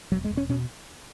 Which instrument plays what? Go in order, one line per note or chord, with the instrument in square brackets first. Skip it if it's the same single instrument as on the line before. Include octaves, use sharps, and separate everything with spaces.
[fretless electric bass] E1 F#3
G#3
E1
C#4
B2 C#4